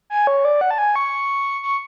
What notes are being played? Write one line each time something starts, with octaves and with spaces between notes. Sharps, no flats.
G#5
C#5
D5
F#5
A5
G#5
C#6
C#6